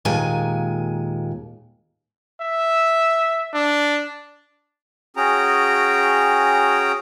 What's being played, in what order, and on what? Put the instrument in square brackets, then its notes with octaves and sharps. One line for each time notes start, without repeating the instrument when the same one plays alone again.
[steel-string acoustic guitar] D#2 A#2 G#3 G#5
[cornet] E5
D4
[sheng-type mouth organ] C#4 F#4 G#4 G5 A#5